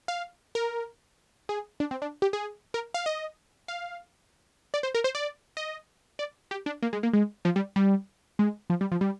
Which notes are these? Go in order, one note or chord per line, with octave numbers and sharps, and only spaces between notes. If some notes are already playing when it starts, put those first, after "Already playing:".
F5
A#4
G#4
D4
C4
D4
G4
G#4
A#4
F5
D#5
F5
D5
C5
A#4
C5
D5
D#5
D5
G4
D4
A#3
G#3
A#3
G#3
F3
G3
G3
G#3
F3
G3
F3
G3